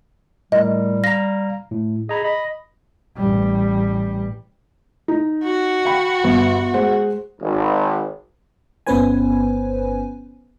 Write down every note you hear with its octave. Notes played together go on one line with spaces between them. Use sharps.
A2 G3 A#4 D#5
F5 A#5 A#6
A2
G#4 D#5 A#5 B5
D#5 B5
A1 G3
D#4
F#4
F5 G5 B5
G1
G#3 C5 F#5
G#1
G1 B3 C#4 B4 C5 G#5